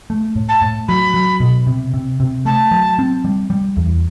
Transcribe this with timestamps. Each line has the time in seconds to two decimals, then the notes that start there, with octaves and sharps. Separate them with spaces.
0.10 A3
0.36 A2
0.49 A5
0.62 A2
0.88 F#3 B5
1.14 F#3
1.40 B2
1.67 C3
1.94 C3
2.20 C3
2.45 A3 A5
2.71 F#3
2.99 C4
3.25 G3
3.50 G3
3.77 E2